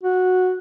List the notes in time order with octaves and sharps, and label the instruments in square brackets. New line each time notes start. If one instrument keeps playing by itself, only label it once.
[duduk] F#4